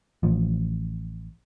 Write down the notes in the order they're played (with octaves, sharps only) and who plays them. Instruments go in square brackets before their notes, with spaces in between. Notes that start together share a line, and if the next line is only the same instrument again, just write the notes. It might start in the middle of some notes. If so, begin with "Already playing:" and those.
[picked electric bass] A1 F3